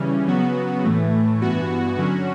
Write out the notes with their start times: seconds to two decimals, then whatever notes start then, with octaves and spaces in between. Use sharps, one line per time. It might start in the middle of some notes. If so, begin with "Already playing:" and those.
Already playing: C#3 E3 G3 C#4
0.28 C#3 F#3 B3 F#4
0.85 A2 E3 A3
1.42 G2 E3 B3 F#4
1.98 D3 F#3 C#4 F#4